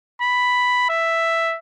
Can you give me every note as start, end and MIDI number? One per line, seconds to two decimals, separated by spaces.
0.22 0.87 83
0.90 1.57 76